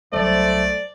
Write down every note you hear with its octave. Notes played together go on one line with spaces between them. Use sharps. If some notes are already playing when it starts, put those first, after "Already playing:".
C2 F#3 A3 C5 D5